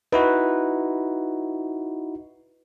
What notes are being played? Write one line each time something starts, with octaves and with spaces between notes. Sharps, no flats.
D#4 E4 F#4 B4